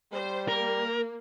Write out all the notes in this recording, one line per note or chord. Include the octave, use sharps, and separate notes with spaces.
G3 C5
A#3 A#4